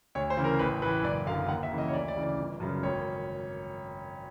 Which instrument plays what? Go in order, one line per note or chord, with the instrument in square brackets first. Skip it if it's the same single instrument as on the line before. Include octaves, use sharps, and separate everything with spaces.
[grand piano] D2 C#5
C5
C#3 E3
A#4
A1 B4
A2 E3 B4
F#1 D5
F#2 D3 F5
D#2 F#5
E5
C#3 E3
D#5
C#5
D2 D5
D5
C#3 E3
D5
G1
F#2 C#3
G#1 C#5